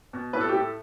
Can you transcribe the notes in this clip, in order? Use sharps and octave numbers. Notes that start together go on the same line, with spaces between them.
B2
A2 B4
A4
G4
A2 A4